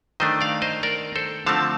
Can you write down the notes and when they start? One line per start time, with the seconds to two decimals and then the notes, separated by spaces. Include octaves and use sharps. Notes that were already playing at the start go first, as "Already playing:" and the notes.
0.20 D#3 A3 D4 C5 D#5
0.41 D5 F5
0.62 C5 D#5
0.83 A#4 D5
1.16 A4 C5
1.46 D3 F3 A3 C4 F5 A5